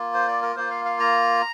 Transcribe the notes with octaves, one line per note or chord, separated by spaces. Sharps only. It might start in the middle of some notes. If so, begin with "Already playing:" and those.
Already playing: A#3 F4
C5
D5
A#4
A#3 F4 C5
F5
F5
A#5